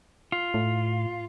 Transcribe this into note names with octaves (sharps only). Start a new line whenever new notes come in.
F4
A2